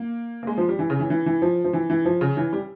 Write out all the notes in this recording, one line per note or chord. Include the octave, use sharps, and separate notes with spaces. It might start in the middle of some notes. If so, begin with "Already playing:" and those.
Already playing: A#3
A#3
G#3
F3
G3
E3
C#3
E3
E3
E3
F3
F3
E3
E3
F3
C#3
E3
G3